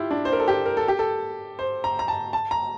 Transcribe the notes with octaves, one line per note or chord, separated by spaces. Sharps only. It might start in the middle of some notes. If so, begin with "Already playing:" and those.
Already playing: E4 F4 G4
D4
C5
A#4
A4
G4
A#4
A4
G4
A4
C5
A#5
A#5
A5
A5
A#5